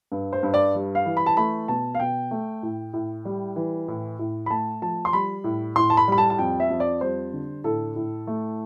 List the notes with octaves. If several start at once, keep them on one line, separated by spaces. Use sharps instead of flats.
G2
C5
G2
D5
G3
F5
E3
B5
A5
A3 B5
B2 A5
F5
B2 G5
A3
A2
A2
G3
E3
A2
A2
B5
A3 A5
F3 A5
C6
G3 B5
A2
A2 C6
A5
B5
G3 B5
A5
A5
F2 G5
E5
F2
D5
G3 C5
D3
A2 A4
A2
A3